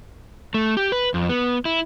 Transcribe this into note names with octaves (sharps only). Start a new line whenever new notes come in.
A3
G4
B4
F2
B3
E4